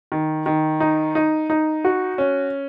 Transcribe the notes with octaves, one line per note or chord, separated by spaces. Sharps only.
D#3
D#3
D#4
D#4
D#4
F#4
C#4